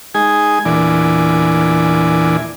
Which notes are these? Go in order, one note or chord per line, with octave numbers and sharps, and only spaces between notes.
G#3 D#4 G#4 G#5
E2 A#2 E3 D4 D5 G#5